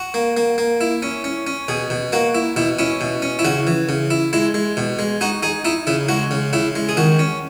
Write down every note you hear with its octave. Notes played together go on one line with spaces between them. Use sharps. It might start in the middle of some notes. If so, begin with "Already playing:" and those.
Already playing: F#4
A#3
A#3
A#3
E4
C#4
C#4
C#4
B2 G#4
B2
A#3 F#4
E4
B2 E4
C#4 E4
B2
C#4
E4
C#3 F#4
E3
C#3
E4
G#3 E4
G#3
B2
G#3
D#4 F#4
D#4 G#4
D#4 E4
C#3 E4
G#3 F#4
C#3
C#3 E4
G#3
G#4
D#3 F#4
C#4